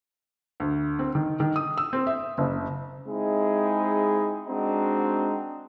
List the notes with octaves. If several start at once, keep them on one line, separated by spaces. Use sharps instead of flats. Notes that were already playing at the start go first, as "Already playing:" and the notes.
D2
C4
D#3
D#3
D#6
E6
C4
E5
F#1
G#3 C4 D#4 E4 G#4
G#3 C4 D4 D#4 F#4